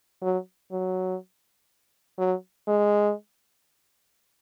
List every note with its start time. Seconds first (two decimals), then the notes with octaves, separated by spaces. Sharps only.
0.22 F#3
0.71 F#3
2.19 F#3
2.68 G#3